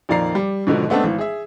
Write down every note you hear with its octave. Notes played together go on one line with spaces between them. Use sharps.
F2 A#2 D#3 D5 A#5 C7
G3
G#2 B2 D3 D#3 F3
G#3 A3 B3 C4 D4
G#1 E3
G#4 E5